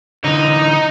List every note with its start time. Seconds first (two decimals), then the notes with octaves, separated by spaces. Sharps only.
0.24 D3 E3 D#4